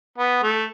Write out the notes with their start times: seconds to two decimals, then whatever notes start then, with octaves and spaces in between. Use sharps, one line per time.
0.18 B3
0.43 A3